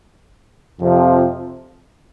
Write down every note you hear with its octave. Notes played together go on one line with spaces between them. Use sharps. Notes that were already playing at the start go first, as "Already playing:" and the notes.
F2 C3 F3